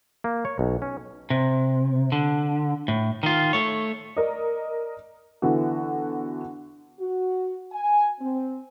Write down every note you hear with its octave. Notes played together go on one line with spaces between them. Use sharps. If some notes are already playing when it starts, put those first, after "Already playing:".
A#3
C#5
B1
C#4
C3
D3
A2
D#3 F4
A3 C#5
A#4 D5 D#5
D3 E3 B3 F#4
F#4
G#5
C4